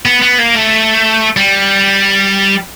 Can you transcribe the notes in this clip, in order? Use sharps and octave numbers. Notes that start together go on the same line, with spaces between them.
B3
B3
A#3
A3
G3